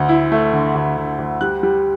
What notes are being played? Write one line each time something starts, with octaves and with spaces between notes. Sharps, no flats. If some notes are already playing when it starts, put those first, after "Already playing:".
Already playing: D2 D3
E4
A3
D3
D2
D3
D2
G3 F#6
G3